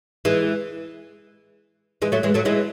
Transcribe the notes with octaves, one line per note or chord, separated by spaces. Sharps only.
E3 G#3
E3 G#3
F#3 A3
E3 G#3
F#3 A3
E3 G#3